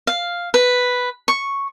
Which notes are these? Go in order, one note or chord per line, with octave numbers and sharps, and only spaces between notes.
F5
B4
C#6